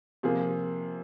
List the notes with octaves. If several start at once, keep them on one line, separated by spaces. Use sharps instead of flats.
C3 F3 A#3 G#4